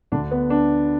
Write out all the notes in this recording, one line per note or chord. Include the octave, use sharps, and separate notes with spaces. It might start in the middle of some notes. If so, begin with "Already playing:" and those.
D2 D3 D4
B3
D4